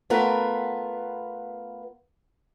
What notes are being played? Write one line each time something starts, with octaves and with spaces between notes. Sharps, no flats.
A3 B3 F4 A#4 B4